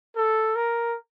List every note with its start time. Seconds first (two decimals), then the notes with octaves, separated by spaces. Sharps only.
0.16 A4
0.56 A#4